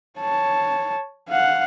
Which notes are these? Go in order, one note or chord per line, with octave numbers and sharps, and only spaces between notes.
C#5 A5
F5 F#5